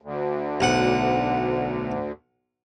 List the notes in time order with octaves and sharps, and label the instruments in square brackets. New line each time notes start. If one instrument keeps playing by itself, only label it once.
[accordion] D2
[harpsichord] B1 F#5